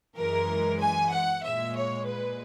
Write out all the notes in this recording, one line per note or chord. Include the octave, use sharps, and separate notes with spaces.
F#2 E3 G#3 A#4
G#5
F#5
A#2 G#3 E5
C#5
B4